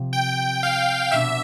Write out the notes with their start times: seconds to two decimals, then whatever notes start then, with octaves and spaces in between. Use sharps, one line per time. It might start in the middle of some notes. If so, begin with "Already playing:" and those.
Already playing: C3 F3 C4
0.13 G5
0.63 F5
1.11 B2 B3 D4 E5